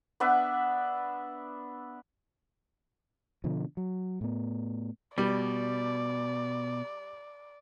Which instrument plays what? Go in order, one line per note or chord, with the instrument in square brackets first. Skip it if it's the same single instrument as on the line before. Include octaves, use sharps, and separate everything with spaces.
[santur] B3 D4 B4 E5
[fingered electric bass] B2 D3 F3
F#3
A2 B3
[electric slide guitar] B2 [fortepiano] G3 [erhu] D5